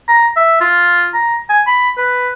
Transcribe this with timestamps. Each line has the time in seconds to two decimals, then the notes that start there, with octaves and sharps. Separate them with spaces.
0.08 A#5
0.36 E5
0.61 F4
1.14 A#5
1.50 G#5
1.67 B5
1.98 B4